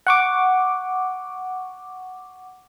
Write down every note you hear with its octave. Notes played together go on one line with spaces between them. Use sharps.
F#5 C#6 D6